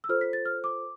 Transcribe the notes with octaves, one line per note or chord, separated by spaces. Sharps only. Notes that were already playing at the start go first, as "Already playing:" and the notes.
E6
F4 A4 C5 F6
B6
A6
F6
D6